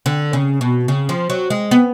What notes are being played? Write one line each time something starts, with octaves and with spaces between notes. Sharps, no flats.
D3
C#3
B2
C#3
F3
F#3
G#3
B3